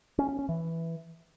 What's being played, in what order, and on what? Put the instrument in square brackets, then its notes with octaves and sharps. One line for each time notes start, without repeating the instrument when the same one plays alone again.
[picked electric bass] C#4
C#4
C#4
E3